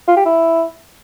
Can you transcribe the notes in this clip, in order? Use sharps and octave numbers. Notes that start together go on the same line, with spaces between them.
F4
G4
E4